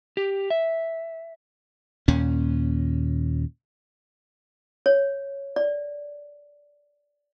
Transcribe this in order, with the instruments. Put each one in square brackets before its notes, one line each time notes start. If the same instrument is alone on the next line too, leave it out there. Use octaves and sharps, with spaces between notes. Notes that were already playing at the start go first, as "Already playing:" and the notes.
[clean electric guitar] G4
E5
[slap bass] D#2 A#2 C#4
[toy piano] C#5
D5